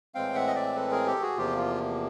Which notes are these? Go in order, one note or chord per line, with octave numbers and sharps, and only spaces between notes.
A2 E3 G#3 C4 F5 G5
E5 F#5
D#5
D5 E5
A4 B4
G#4 A#4
G4 A4
F#4 G#4
E2 C3 F3 A#3 F4 G4
F4